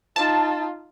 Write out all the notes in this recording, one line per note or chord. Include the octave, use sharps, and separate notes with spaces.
D#4 F4 A5